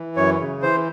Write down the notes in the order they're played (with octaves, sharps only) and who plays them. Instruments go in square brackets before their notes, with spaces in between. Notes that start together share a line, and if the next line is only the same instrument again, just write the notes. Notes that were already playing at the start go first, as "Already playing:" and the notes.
Already playing: [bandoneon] E3
F#2 C#5
C#3
E3 C5